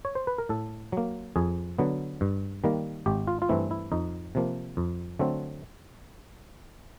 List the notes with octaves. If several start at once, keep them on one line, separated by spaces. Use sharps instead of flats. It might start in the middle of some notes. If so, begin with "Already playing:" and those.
C#5
C5
B4
A#4
A2 A4
F#3 A#3
F2 G#4
D3 F#3 B3
G2
D#3 G3 A#3
G#1 G4
F4
F4
G2 E3 A3 C4 E4
E4
F2 D#4
C3 F3 A#3
F2
D3 F#3 A3 C4